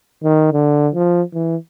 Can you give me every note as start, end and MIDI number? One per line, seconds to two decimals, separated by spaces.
0.24 0.49 51
0.52 0.89 50
0.94 1.22 53
1.33 1.56 52